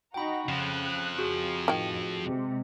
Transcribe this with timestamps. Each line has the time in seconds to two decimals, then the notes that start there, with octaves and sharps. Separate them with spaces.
0.14 D#4 F#4 G5 A#5 B5
0.49 F2 C#3 F3 F#6
1.18 F#4 G#4
1.68 A2 D#3 G5
2.22 C3 G#3